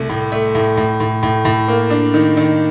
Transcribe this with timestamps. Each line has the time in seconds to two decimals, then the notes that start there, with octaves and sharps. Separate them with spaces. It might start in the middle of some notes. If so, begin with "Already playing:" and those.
Already playing: C2 A3
0.09 A2
0.32 A3
0.55 A2
0.77 A2
1.00 A2
1.23 A2
1.45 A2
1.68 A#3
1.90 D4
2.14 D#3
2.37 D#3